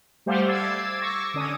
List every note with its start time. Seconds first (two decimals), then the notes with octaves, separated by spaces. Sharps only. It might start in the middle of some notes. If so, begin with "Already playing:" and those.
0.26 G3 A3 G4 C5 F5 F#5
0.48 D6 E6 G#6 A6 C7
1.02 C#6 D6 E6 A#6
1.34 D3 C#4 D#6